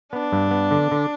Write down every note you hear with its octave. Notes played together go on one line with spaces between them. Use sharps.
B3 D4
G2
B3
D3
D3